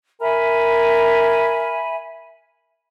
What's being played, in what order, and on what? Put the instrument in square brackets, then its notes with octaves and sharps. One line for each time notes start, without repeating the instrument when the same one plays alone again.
[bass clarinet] A#4 [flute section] E5 G#5 B5